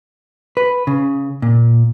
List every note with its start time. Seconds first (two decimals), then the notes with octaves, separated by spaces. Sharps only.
0.57 B4
0.87 C#3
1.42 A#2